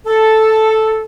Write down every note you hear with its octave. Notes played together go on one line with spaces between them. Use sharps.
A4